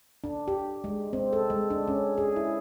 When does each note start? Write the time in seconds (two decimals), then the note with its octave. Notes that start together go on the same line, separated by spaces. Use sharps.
0.24 D4
0.48 G4
0.84 G#3
1.13 C4
1.33 A4
1.50 G#3
1.70 D4
1.88 C#4
2.18 G#4
2.36 E4